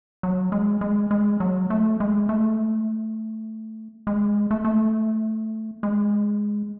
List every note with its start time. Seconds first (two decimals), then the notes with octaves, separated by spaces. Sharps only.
0.23 F#3
0.52 G#3
0.81 G#3
1.11 G#3
1.40 F#3
1.70 A3
2.00 G#3
2.29 A3
4.07 G#3
4.51 A3
4.65 A3
5.83 G#3